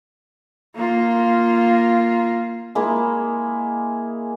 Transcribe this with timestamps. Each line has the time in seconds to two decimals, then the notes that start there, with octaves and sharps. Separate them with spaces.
0.76 A#3 F4
2.75 G#3 A#3 E4